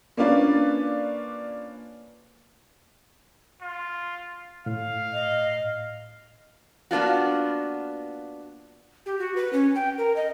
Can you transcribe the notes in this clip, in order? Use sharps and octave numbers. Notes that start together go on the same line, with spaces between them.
A#3 C#4 D4 F4 B4 D5
F4
A2 F5
D#5
A#3 B3 D4 F4 F#4
G4
F#4
B4
C#4
G5
A#4
D#5